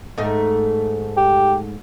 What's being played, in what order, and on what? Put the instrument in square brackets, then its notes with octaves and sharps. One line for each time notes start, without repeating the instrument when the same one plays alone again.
[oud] G#2 A3 D#4
[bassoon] G4